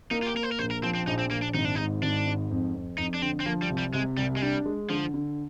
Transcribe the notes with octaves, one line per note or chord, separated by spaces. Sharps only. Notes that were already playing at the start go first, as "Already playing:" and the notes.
A#3 D#4
F4
G4
A#3 A#4
C5
A#4
A#1 C5
A#4
F3 C4
C4
A#1 D#4
C4
A#1 A#3
D4
G#1 D#4
D4
D#4
G#2
G#1 D4
G#2
F2
F2
F2 D#4
D4
D3 C4
C4
F3 A#3
G3
C2
G3
C3 G#3
C2 G3
G#3
G3 D4
G#3
D3 F3
D3